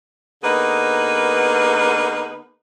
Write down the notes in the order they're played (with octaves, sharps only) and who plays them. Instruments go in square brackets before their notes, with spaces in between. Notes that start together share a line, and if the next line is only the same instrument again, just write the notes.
[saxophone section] D3 A#3 B3 D#4 G#4 B4